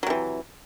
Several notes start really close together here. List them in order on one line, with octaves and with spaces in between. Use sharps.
F#3 C3 E3